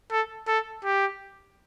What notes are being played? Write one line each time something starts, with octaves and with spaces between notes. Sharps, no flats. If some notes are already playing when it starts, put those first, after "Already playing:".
A4
A4
G4